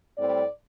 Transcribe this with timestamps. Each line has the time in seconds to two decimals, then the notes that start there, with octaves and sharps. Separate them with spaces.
0.16 A2 G3 C4 D5